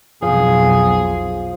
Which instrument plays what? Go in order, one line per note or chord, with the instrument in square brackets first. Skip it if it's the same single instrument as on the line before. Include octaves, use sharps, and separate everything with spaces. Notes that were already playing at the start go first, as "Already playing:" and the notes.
[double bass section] B1 F2 [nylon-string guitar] F3 [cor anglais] G#4